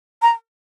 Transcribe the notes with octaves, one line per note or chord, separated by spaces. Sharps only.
A#5